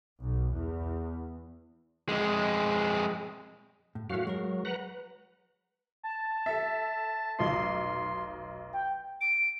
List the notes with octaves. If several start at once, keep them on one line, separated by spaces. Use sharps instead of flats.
B1
E2
F2 G#3
A2
F#2 E3 A3 F#4 F5
F#3 G#3 A#4
B4 F#5 A#5
A5
A4 E5
F1 B1 D#4 C6
G5
D7